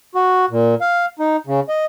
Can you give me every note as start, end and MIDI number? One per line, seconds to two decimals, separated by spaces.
0.15 0.45 66
0.50 0.75 46
0.81 1.06 77
1.19 1.36 63
1.47 1.60 49
1.69 1.85 75